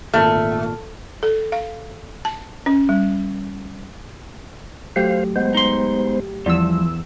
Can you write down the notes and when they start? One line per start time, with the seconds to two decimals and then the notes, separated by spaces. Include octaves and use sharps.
0.14 G#1 A#2 A3 F6
1.23 A4
1.52 F5
2.25 A5
2.66 C#4
2.89 G3
4.96 F#3 A3 G4 C5 F5
5.36 G#3 B3 C5
5.54 D#4 C6
6.46 E2 F3 G3 E6